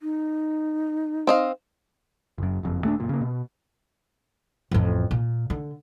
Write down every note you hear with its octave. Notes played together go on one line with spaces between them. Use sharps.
D#4
C4 D#5 F5
F#1 F#2
F#1 F2
D#1 A3 C#4 D4
F#1 A#2
C#3 A#3
B2
A1 F2
A#2
D3